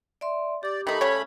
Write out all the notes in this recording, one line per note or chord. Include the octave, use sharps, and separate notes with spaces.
D5 E5 C6
G4 D5 D6
D#3 A3 D#4 B5
C#3 G3 C#4 C#5